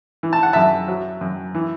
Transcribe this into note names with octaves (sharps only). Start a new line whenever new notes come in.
E3
A5
F#5
F#2 E5 A5
F#3
F#2
E3